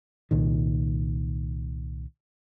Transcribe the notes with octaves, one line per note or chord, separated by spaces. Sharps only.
C2 A#2 D#3